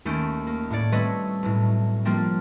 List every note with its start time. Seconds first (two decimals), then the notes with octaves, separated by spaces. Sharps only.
0.05 D#2 A3 C#4 G6 D7
0.47 A#3
0.70 A2 A#3 C#5 D5
0.92 G3 A3 C4 B4 C#5 D#5
1.43 B1 A2
2.05 F3 G3 A#3 C4 D4